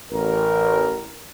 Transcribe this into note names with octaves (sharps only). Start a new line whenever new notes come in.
A1 A#4